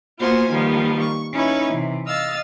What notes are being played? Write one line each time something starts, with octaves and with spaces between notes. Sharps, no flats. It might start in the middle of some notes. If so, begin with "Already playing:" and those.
A#3 B3 F4 F#4 C5 G#5
D#3 F3 G3 A#3 B3
C#6
C#4 D#4 E4 B4 C#5
C3 E3
D#5 F5 E6 A6